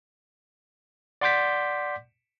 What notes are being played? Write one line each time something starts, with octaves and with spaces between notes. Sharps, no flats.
D5 F#5 C6 D6 G6 B6